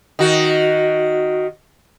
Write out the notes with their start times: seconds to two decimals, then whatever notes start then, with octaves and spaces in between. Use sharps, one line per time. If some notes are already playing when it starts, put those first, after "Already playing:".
0.19 D#3 F#4